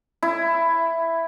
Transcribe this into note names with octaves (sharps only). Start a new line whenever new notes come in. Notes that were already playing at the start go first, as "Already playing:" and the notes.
E4